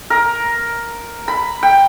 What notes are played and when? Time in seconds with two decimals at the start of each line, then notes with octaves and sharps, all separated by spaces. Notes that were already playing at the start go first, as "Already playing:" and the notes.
0.10 A#4
1.28 B5
1.63 G5